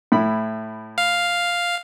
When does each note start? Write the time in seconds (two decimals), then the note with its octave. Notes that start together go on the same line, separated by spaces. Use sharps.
0.12 A2 E4 B5
0.98 F5